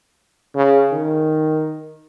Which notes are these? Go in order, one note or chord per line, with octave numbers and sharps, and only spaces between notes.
C#3
D#3